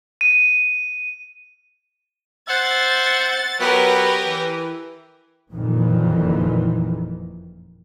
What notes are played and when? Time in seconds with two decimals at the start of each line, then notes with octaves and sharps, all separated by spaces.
0.21 D#7
2.48 C5 E5 F#5 A6
3.60 F#3 B3 G4 A#4 B4
4.26 E3
5.52 F#1 F2 A#2 D#3 E3